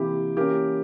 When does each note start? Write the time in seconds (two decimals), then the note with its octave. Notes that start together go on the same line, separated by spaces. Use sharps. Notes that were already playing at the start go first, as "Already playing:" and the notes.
Already playing: C3 E3 A#3 E4 G4
0.37 E3 A#3 C#4 G4 A#4